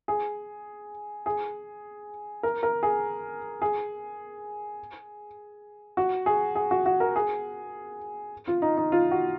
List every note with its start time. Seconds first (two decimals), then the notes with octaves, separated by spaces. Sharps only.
0.08 G#4
1.26 G#4
2.43 A#4
2.63 A#4
2.83 G#4
3.62 G#4
5.97 F#4
6.26 G#4
6.55 G#4
6.71 F#4
6.86 F#4
7.00 A#4
7.16 G#4
8.48 F4
8.62 D#4
8.77 D#4
8.92 F4
9.11 F#4